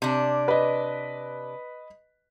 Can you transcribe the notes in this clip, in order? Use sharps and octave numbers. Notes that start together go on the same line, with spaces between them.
C3 D4
B4 D#5